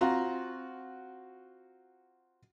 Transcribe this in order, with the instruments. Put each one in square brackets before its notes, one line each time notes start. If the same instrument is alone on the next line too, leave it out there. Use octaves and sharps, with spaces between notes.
[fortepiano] C4 F4 F#4 A#5